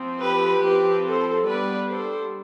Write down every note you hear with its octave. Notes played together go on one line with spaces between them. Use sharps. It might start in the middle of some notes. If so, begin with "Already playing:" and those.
Already playing: F3 C4
G4 B4
F3 C4 G4 B4
A4 C5
G3 B3 D4 B4 D5
A4 C5